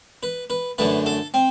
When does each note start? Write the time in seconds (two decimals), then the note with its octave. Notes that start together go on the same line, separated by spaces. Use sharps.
0.23 B4
0.50 B4
0.78 F#2 D3 A3 B4
1.06 A4
1.34 C4